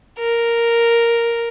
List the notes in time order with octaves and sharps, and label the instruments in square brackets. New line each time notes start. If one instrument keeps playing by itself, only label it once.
[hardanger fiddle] A#4